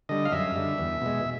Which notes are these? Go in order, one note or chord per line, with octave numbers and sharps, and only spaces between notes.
D3 G3 D#5
F5
F#2 E5
D3 G3
E2
B2 G#3